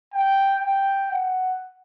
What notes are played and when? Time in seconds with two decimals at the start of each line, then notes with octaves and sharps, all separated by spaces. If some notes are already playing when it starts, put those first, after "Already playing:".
0.14 G5
0.63 G5
1.11 F#5